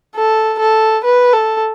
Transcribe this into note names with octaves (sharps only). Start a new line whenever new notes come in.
A4
A4
B4
A4